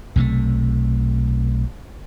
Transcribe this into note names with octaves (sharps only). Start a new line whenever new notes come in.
B1 C3 F3 A3